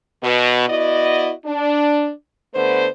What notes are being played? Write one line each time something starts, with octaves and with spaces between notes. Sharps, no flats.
B2
B3 E4 F#4 D5 D#5
D4
D3 A3 B3 B4 C5